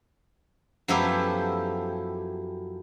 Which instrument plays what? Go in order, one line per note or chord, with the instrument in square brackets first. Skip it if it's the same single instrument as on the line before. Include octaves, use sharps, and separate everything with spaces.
[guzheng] F#2 F3 A3 B3 E4 G4